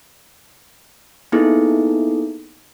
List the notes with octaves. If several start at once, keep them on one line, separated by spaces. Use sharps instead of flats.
A#3 B3 D#4 E4 G#4 A4